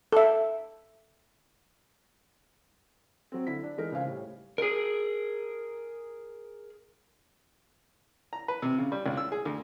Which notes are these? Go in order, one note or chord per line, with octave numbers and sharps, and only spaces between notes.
A4 E5
F#3 C4
D3 E4 B6
D4
E3 G#3 D#4 A#4
C#2 D#4 C5 F5 G#5
A2 G3
G#4 A#4
A#5
B4
C3
C#3
G3
C#2
E6
G#4
D2